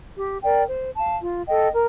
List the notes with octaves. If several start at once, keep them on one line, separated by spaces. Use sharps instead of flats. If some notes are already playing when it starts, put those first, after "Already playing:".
G4
A#4 D5 G5
C5
F5 A5
F4
A4 D#5 G5
A#4